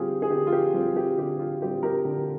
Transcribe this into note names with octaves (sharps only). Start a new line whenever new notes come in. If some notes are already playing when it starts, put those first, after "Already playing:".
Already playing: D3 G3 C4 F4 G4 G#4
G#4
D3 G4
F4
G4
G3 C4 F4
G4
D3 G4
F4
G3 C4 G4
G4 A#4
D3